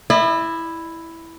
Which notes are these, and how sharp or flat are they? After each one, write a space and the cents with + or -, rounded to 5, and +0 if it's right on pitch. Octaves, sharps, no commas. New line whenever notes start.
E4 +0 D#5 -45